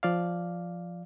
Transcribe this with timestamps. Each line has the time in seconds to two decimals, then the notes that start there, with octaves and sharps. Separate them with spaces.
0.03 F3 D5 F5